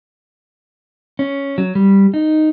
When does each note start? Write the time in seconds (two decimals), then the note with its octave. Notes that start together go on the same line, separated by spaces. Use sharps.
1.19 C#4
1.58 F#3
1.75 G3
2.14 D#4